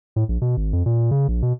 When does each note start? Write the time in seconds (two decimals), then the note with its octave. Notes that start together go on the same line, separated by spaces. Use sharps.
0.16 A2
0.29 A#1
0.42 B2
0.57 G#1
0.73 F2
0.86 A#2
1.11 C#3
1.28 A#1
1.42 B2